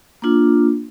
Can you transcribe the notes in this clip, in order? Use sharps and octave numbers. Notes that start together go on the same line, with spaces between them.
A#3 D4 F4